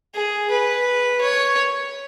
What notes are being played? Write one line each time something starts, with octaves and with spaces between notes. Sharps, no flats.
G#4
B4
C#5